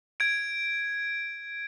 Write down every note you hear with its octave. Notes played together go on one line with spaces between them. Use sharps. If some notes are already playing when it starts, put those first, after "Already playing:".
G#6 D7